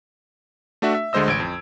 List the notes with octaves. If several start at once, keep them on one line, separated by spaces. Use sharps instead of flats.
A3 D4 F#4 E5
E5
D2 D3 G#3 C5 D#5 E6
A1 G#6 D7
F2